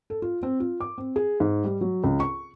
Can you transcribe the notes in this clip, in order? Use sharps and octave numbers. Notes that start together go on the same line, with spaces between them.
A4
F4
C4
F4
D6
C4
G#4
G#2
G3
F#3
C#2
C#6